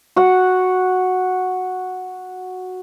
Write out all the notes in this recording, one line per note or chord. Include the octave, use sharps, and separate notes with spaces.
F#4 F#5